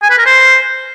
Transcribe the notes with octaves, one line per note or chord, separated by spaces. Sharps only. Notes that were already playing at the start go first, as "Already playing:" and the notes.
G#5
B4
A#4
C5